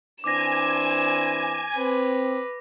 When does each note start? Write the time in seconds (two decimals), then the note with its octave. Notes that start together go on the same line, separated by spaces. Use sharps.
0.24 E3 C4 D4 G#5 D6 A#6 E7
1.76 C4 B4